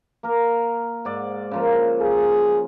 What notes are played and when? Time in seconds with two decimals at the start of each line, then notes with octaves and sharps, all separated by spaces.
0.23 A#3 A#4
1.05 G#2 D5
1.51 C#3 F3 A#3
2.01 G#4